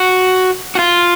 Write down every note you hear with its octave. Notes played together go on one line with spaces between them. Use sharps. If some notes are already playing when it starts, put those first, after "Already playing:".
Already playing: F#4
F#4
F4